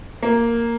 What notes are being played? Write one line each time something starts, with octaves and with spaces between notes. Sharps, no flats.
A#3